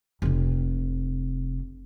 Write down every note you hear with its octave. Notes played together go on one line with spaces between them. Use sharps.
F1 C3